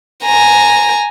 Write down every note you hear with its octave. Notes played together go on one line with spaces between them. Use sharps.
G#5 A#5